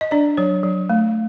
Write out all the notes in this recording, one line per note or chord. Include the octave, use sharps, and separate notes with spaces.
D#5
D4 D5
F#3 C#5
F#3
A3